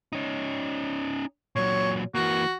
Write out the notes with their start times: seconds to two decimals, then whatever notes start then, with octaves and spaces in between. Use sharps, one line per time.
0.13 C#4 D#4
1.56 A#2 F#3 C#5
2.15 E3 A#3 F#4